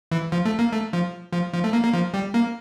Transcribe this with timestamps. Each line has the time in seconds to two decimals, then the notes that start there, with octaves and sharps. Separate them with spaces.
0.12 E3
0.32 F3
0.45 A3
0.59 A#3
0.72 A3
0.93 F3
1.33 F3
1.54 F3
1.64 A3
1.73 A#3
1.84 A#3
1.93 F3
2.14 G3
2.34 A#3